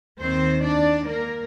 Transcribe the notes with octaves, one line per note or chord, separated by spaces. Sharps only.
D#2 D#3 C4 C5
D4 D5
A#3 A#4